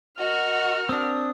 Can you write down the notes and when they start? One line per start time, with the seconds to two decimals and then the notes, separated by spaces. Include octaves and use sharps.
0.19 F#4 A#4 D#5 F6
0.89 C4 D4 D#6